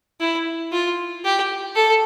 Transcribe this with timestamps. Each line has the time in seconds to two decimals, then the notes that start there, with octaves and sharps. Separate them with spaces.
0.20 E4
0.72 F4
1.24 G4
1.76 A4